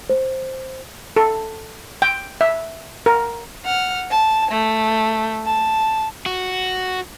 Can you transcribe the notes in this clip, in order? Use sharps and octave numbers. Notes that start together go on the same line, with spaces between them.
C5
A4
G5
E5
A#4
F#5 F6
A5
A3
A5
F#4